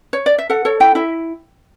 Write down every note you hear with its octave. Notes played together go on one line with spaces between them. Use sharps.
C#5
D5
E5
A4 F#5
A4 C#5
E4 G5
E4 E5